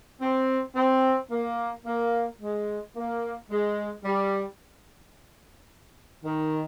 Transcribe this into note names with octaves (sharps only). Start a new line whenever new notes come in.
C4
C4
A#3
A#3
G#3
A#3
G#3
G3
D#3